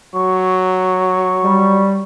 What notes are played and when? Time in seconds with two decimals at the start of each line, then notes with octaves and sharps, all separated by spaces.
0.15 F#3 C#6
1.43 G3